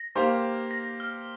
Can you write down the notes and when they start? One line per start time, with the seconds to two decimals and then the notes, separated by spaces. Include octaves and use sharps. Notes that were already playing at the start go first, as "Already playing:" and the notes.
Already playing: A#6
0.15 A#3 G4 C5 F5
0.71 A#6
1.00 F6